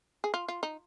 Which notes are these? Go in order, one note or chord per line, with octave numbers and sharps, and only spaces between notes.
G#4
F4
F4
D#4